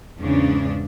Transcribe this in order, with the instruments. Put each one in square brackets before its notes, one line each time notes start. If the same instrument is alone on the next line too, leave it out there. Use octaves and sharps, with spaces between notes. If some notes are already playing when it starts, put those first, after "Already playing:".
[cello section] E2 G#2 C#3 C#4 D4